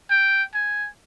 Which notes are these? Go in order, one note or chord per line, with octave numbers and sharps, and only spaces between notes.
G5
G#5